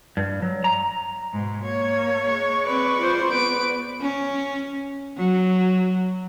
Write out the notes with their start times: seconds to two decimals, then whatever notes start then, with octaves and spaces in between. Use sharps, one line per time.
0.17 G2
0.42 F#3
0.64 A#5
1.33 G#2 B2
1.62 A#3 C#5
2.25 G#3 C#6
2.66 C4 B4 D5
2.98 F4 C5
3.30 B3 B4 D7
4.01 C#4
5.18 F#3